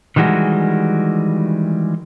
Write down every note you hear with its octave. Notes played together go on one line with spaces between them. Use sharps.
D#3 E3 G3 G#3 F#4